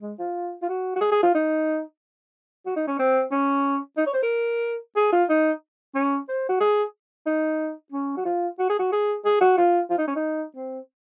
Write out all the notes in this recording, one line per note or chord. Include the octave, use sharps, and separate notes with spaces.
G#3
F4
F4
F#4
F#4
G#4
G#4
F4
D#4
F#4
D#4
C#4
C4
C#4
D#4
C#5
C5
A#4
G#4
F4
D#4
C#4
C5
F#4
G#4
D#4
C#4
F#4
F4
F#4
G#4
F#4
G#4
G#4
F#4
F4
F4
D#4
C#4
D#4
C4